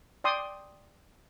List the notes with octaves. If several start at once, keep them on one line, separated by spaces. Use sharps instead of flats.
D5 G5 C6 D#6